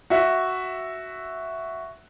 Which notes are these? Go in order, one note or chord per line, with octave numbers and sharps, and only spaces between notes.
F#4 E5